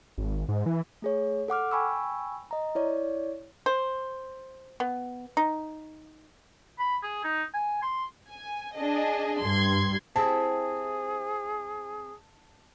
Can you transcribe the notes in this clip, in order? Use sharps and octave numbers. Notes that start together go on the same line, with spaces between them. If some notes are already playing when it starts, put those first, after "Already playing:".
G#1
G#1
G#2
E3
A3 G#4 C#5
A4 F#5 D6 F6
G5 G#5 B5 C#6 E6
D#5 A#5
E4 C#5 D5
C5
B3
D#4
B5
G#4
D#4
G#5
C6
G#5
D4 G#4 D#5
G2 C6 G#6
C4 E4 G4 G#4 A5